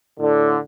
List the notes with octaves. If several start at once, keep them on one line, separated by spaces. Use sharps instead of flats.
A2 D3